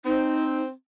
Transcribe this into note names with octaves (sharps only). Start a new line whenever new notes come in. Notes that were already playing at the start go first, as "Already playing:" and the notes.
C4 D#4